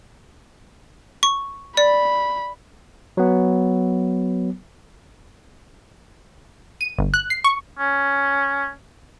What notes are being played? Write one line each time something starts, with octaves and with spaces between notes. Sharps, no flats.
C#6
D5 B5
F#3 B3
D#7
G1
F#6
C7
C#6
C#4